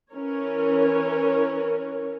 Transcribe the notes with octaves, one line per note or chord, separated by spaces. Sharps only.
E3 C#4 A#4 C#5